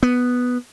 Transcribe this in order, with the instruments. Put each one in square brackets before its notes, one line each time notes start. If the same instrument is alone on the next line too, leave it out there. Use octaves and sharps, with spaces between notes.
[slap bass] B3